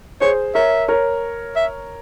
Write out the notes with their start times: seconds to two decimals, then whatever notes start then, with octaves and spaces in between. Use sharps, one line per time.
0.21 G#4 C5 C#5
0.55 A#4 C#5 E5
0.88 A#4 C#5
1.56 E5